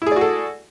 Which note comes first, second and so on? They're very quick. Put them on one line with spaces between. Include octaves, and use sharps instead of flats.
E4 G#4 D5 F#4 A4